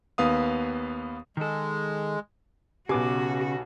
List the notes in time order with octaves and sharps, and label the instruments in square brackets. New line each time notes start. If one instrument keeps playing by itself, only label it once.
[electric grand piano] D#2 B3 F5 D#6
[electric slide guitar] D#3 A4 [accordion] G#3
[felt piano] B1 B3 G#5 [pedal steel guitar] C#3 D6 [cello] F#4 [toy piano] G4